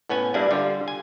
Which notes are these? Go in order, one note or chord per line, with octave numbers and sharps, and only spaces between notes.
A2 B3 C#4 G#5
G2 G3 A#3 D4 E4 G#5
D3 G3 F4
G#5